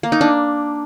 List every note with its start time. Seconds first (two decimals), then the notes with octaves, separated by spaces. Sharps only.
0.03 A#3
0.12 D#4
0.21 D4